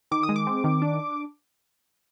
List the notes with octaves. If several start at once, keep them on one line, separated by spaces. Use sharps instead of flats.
D#3 D6
D#6
G#3
D6
C4
D#3
D4